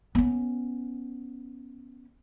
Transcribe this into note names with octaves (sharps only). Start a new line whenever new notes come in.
B3 C#4